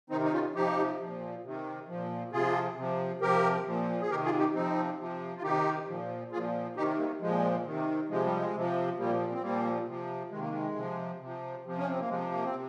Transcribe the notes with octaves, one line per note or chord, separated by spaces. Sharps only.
C3 D#3 C4 D#4
D#4
C#4 F4
C3 F3 D#4 G4
A#2 F3
C3 D#3
A#2 F3
C3 F3 F4 G#4
C3 F3
C3 F3 G4 A#4
A#2 F3
G#4
C3 D#3 G4 A#4
F4 G#4
D#4 G4
C3 F3 C4 D#4
C3 F3
F4
C3 D#3 D#4 G4
A#2 F3
A#2 F3 F4 G#4
C3 D#3 D#4 G4
G3 A#3
A#2 F3 G#3
C3 D#3
C3 F3 G#3
G3
G#3
C3 F3
A#2 F3 G3 A#3
C4
A#2 F3 G3 A#3
C3 F3
C3 D#3 G#3
A#3
G#3
C3 F3
C3 F3
C3 F3
C#4
C4
A#3
C3 F3 G#3
A#3
C4
C3